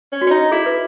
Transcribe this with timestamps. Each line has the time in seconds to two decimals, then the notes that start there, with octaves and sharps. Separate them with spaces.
0.12 C#4
0.22 F#4
0.27 C#4
0.31 D#4
0.52 E4 G#4
0.66 B4